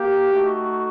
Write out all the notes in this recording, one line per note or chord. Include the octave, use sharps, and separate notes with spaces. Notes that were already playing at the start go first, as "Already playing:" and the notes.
Already playing: A#3 G4
A3 D#4 F#4